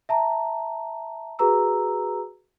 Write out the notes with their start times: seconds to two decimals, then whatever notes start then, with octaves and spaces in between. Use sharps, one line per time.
0.09 E5 A5 A#5
1.39 F#4 G#4 B4 A#5 E6